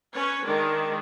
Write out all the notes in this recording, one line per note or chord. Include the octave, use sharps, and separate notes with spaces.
C#4 B4 C#5
D#3 G#3 D4